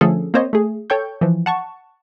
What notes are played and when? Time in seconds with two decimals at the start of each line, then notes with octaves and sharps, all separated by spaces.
0.01 D3 F3 A3 C#4 G#4 A4
0.34 A#3 C4 C5 C#5 D#5
0.53 A3 G#4
0.90 A4 C#5 G5 C#6 G6
1.21 E3 F3
1.46 F#5 A5 C#6